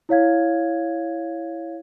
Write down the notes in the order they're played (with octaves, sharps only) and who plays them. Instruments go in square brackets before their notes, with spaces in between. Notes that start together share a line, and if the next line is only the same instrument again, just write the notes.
[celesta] E4 C#5 F5 G#6